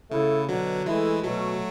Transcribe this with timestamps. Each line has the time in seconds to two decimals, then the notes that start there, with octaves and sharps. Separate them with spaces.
0.10 C#3 A3 E4 A4
0.48 B2 D3 F#3
0.86 E3 G#3 A3 E4 A4
1.23 B2 F#3 A3